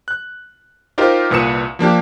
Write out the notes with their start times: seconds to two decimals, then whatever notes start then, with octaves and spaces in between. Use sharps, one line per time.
0.08 F#6
0.98 D#4 F4 G4 A#4 C5
1.30 C2 A#2 B4 D#6 C#7 E7
1.79 F3 A#3 D4 G4